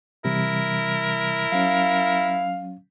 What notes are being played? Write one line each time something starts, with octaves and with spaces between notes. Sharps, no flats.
C3 E3 G3 E4 A#4
F#3 C#4 F5